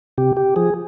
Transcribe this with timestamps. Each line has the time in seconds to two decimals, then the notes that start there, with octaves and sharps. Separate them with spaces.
0.18 C3 G4
0.37 G4
0.56 F3 G#4